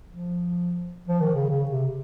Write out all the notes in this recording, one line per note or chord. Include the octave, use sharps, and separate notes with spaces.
F3
F3
D#3
C#3
C#3
C3